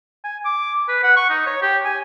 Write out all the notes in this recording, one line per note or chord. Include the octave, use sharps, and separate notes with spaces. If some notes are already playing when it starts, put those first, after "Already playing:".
G#5
D6
B4
F#5
C#6
D#4
C#5
G4
G#5